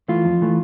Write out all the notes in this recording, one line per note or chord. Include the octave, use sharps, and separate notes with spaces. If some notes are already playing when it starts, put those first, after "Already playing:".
E3 A3 F4
F2
E3 A3